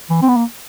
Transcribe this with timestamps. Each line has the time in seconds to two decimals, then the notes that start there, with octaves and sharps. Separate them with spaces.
0.10 E3
0.22 C4
0.28 B3
0.37 A#3